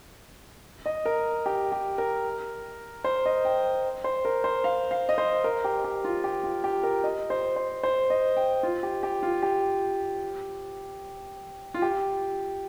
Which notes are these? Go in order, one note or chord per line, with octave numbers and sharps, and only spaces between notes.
D#5
A#4
G4
G4
A#4
C5
D#5
G5
C5
A#4
C5
F5
F5
D#5
C5
A#4
G4
G4
F4
G4
F4
G4
A#4
D#5
C5
C5
C5
D#5
G5
F4
G4
G4
F4
G4
F4
G4